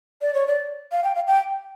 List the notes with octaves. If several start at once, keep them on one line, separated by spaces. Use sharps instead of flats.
D5
C#5
D5
F5
G5
F5
G5